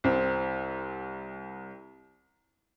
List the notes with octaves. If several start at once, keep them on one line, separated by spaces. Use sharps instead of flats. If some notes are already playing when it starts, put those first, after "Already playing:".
C2 C4